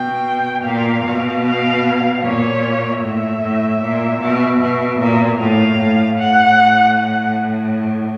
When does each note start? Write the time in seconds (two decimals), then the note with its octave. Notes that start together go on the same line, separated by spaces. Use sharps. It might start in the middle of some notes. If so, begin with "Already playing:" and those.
Already playing: B2 G5
0.64 A#2 F5
1.04 B2
1.44 F5
2.23 A#2 C#5
3.02 A2 E5
3.41 A2
3.81 A#2
4.20 B2
4.60 B2
4.99 A#2
5.39 A2 F5
5.79 A2
6.18 A2 F#5
6.97 F#5